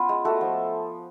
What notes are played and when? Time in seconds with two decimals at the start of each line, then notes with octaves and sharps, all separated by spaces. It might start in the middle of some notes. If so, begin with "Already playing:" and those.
Already playing: B3 C#4 F4
0.09 G#3
0.24 A3 F#4 A4
0.41 F3